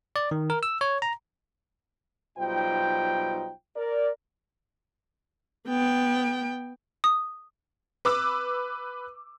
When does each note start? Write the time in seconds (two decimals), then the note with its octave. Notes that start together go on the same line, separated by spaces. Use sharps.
0.16 D5
0.31 D#3
0.50 A#4
0.63 E6
0.81 C#5
1.02 A#5
2.39 B1 G3 D#4 F4 C5 G5
3.76 A#4 D5
5.68 B3 G5
7.04 D#6
8.05 B4 D6 E6